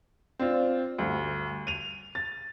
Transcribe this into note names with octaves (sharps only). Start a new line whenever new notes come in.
C4 D4 F4
D2 G2
D#7 F7
A6